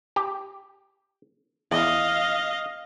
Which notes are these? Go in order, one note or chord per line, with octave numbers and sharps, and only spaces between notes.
G4
E2 D#5 F5